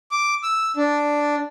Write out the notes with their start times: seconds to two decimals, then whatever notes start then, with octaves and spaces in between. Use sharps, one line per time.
0.11 D6
0.43 E6
0.77 D4